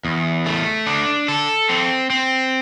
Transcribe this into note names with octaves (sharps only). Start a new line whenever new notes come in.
E2
A3
D4
A4
C4
C4